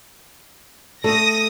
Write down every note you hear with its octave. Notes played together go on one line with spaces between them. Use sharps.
A3 D#6 A#6